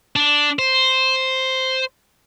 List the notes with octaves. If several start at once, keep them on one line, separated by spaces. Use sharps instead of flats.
D4
C5